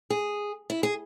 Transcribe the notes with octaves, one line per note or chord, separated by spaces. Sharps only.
G#4
E4
G#4